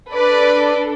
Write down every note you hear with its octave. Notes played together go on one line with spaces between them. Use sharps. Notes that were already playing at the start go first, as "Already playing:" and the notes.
D4 A4 B4 D5